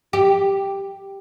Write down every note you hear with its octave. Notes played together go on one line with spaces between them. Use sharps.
G4